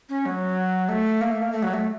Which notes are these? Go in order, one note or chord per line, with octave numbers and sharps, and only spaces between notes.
C#4
F#3
A3
A#3
A3
A#3
A3
F#3
A3